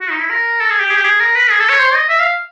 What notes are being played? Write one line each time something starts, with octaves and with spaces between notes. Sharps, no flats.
F#4
D#4
E4
A#4
A4
G#4
G4
G#4
G4
G#4
A#4
B4
G#4
A4
C#5
C5
D#5
E5
F5